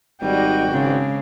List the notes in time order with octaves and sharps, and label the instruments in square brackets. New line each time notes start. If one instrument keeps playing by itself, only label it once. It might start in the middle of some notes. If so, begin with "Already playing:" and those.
[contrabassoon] G#1 [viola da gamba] G3 [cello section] D#4 D5 D#5 [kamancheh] F#4 G5
[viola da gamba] C#3 [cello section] G#3 C4 D4